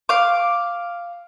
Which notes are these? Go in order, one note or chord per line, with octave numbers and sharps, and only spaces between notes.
F5 D6